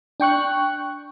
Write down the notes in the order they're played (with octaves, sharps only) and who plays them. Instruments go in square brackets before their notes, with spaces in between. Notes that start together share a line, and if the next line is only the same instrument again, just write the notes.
[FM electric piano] D4 G5 C#6 F#6